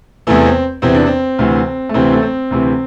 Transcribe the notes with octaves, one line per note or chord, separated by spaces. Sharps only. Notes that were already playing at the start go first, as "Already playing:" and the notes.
E2 C3 E3 A3
C4
E2 C3 E3 C4
D4
C4
D2 C3 E3
A3
D2 C3 E3 C4
A3
C4
D2 C3 E3